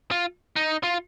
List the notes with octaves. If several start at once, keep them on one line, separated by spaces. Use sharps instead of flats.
F4
D#4
F4